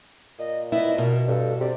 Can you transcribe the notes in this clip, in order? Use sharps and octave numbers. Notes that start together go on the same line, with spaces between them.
A#2 D#5
B3 E4 D#5
B2 A#4
G2 A4
C3 D5